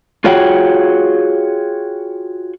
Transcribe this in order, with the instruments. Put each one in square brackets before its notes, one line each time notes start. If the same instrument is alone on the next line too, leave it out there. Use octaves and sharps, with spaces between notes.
[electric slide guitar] F4 F#4 G#4 C#5 F#5 G5